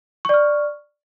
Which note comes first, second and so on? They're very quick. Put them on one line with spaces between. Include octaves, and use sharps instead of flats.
C#6 D5 F6